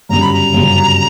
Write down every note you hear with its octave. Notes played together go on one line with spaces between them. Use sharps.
G1 F#2 C#3 G3 A#5
B5
A#5
G1 F#2 C#3 G3